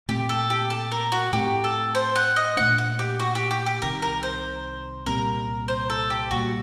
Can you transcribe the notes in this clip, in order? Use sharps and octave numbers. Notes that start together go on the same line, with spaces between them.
A#2 A3 C4 G4
A4
G4
A4
A#4
F#4
A2 A3 C4 G4
A4
C5
F#5
D#5
A#2 A3 D4 F#5
F#5
G4
F#4
G4
G4
G4
C2 C3 D#3 A#4
A#4
C5
C2 A#2 G3 C4 A#4
C5
A4
G4
C2 A#2 G3 F#4